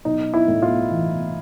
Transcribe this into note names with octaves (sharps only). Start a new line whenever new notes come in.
B1 D#4
E4
A2
F4
E3